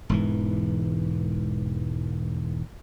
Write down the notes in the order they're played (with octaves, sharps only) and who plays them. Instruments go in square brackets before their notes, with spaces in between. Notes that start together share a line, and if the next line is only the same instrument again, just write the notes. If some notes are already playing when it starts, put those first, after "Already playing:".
[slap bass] E1 G#2 E3